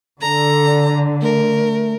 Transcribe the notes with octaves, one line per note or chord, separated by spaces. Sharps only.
D3 A4 A#5
A3 A#4